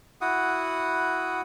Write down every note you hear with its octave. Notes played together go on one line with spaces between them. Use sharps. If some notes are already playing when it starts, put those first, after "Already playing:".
E4 F#4 F#5 D#6